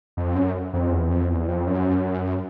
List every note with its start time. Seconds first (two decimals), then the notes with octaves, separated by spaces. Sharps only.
0.17 F2
0.35 F#2
0.73 F2
0.92 E2
1.10 F2
1.29 E2
1.48 F2
1.67 F#2